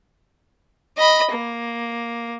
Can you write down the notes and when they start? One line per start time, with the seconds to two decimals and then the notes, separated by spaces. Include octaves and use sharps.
0.97 D#5 B5
1.32 A#3